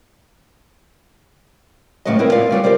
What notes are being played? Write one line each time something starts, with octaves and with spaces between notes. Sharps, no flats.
E2 A2 C#3 F#3 G#3 D#5
B3 C4 E4 A#4
F4 A#4 D5 F5
C#3 G3 B3
G4 A#4 C5 D5